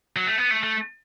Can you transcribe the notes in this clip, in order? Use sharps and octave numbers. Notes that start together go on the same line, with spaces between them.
F#3
A3
B3
A3
A3